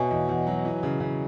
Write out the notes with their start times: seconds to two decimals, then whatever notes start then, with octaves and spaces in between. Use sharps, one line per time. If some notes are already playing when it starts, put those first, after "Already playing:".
Already playing: B2 B4 C#5 D#5 E5 G#5
0.11 E2
0.29 E2
0.47 F#3
0.65 E3
0.83 C#3
1.00 C#3